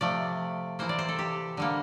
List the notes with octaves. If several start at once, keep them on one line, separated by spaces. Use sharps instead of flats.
C3 F3 A3 D5
C3 E3 A#3 C5
D5
C5
A4
G4
D3 G3 A#3